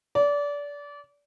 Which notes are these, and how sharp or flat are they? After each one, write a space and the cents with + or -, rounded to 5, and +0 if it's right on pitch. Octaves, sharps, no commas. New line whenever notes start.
D5 -25